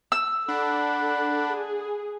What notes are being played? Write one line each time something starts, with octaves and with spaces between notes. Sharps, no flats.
E6
D4 A4 F#5 B5
G#4